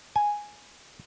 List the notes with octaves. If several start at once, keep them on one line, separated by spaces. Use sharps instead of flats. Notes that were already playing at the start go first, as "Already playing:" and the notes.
G#5